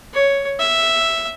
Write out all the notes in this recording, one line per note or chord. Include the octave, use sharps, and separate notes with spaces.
C#5
E5